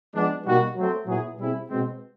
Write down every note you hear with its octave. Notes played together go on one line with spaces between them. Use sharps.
F3 G#3 B3 D4
B2 G3 A#3 D#4 F#4
F#3 A3 C4
A#2 F#3 B3 E4 G#4
B2 G3 C4 E4 G#4
B2 G#3 C4